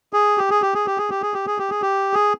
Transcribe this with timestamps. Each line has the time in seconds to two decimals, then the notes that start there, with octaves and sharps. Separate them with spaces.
0.13 G#4
0.38 G4
0.50 G#4
0.62 G4
0.74 G#4
0.86 G4
0.98 G#4
1.10 G4
1.22 G#4
1.34 G4
1.46 G#4
1.58 G4
1.70 G#4
1.82 G4
2.14 G#4